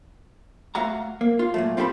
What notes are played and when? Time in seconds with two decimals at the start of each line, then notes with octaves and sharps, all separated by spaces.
0.75 A3 F#4 F5 A#5
1.21 A#3
1.39 F4
1.54 A#2 F#3 A3
1.77 C4 F4 G4 A4 G5 B5